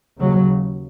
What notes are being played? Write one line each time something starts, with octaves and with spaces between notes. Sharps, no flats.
D#2 C#3 F#3